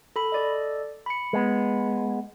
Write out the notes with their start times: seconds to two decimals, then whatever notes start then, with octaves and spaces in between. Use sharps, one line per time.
0.16 A4 B5
0.32 A4 D5 D#5
1.06 B5 C#7
1.33 G#3 B3